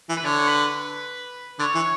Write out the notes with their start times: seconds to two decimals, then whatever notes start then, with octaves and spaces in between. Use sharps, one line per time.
0.09 E3
0.17 B4
0.24 D3 C#5
0.47 B4
1.59 D3 C#5
1.75 E3